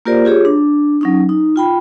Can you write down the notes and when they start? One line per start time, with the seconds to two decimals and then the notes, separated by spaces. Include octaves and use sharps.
0.05 A#3 F4 G4 A#4 C5 D5
0.25 F4 G4 G#4 C#5
0.45 D4
1.01 F#3 C#4 D#4
1.29 D#4
1.56 F4 G5 B5